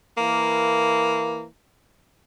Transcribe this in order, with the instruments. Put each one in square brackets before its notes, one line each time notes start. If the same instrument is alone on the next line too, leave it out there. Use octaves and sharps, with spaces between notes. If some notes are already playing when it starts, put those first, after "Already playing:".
[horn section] E3 A#3